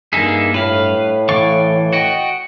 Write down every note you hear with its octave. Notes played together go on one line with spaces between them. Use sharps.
G2 A#3 D#4 G#4 E5
A2 B4 F5
E3 D5 F5 C#6
F#4 D#5 G5